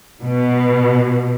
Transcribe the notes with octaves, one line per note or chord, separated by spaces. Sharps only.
B2